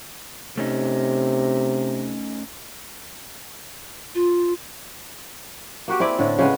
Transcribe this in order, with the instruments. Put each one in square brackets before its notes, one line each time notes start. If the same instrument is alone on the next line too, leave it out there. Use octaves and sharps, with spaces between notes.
[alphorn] C3 [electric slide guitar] A3 C#4 D#4
[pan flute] F4
[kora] A#3 F#4 G4
C4 E4 G#4 D5
A2 D3
C#3 G#3 B3